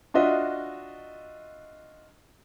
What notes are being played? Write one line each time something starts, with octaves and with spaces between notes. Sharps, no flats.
D4 F4 F#4 D#5 E5